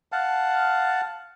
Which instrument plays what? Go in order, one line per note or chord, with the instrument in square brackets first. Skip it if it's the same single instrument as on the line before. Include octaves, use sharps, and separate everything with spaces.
[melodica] F5 F#5 A5